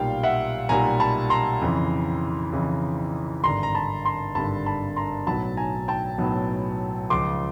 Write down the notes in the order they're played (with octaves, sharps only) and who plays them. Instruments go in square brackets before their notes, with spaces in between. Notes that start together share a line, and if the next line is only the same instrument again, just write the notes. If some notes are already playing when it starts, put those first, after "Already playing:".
Already playing: [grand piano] B1 A#2 G3 F5 G5
E5 F#5
B1 A#2 G3 G#5 A#5
A5 B5
A#5 C6
F2 C#3 E3
F2 C#3 E3
G#1 G2 D3 A#5 C6
A#5
A5 B5
A#5 C6
G#1 G2 D3 A5 B5
A5 B5
A#5 C6
B1 A2 F#3 B3 A5 B5
G#5 A#5
G5 A5
B1 A2 F#3 B3
C#2 C#3 F3 C6 D6